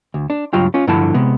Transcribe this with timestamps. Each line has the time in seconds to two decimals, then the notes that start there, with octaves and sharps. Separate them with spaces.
0.14 D2
0.30 D4
0.53 C#2 G2 F#3 F4 G5
0.74 C#4 F4
0.87 G2 D3 F3 E4 F#5 A5
1.14 C3 G#3 B3